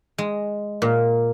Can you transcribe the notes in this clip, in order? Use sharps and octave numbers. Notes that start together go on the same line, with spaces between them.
G#3
A#2